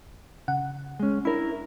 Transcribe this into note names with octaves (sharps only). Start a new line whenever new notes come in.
C#3 F#5
G#3 C#4
D4 E4 A#4 B5